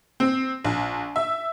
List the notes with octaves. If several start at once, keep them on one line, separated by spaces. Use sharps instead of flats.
C4
A#1
E5